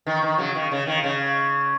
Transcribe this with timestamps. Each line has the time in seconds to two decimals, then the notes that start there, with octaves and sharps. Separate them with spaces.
0.07 D#3
0.22 D#3
0.38 C#3 F#3
0.55 D#3
0.72 C#3
0.87 D#3
1.04 C#3